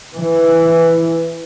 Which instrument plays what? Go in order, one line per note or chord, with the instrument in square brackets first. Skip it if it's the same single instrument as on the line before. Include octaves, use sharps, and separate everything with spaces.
[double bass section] E3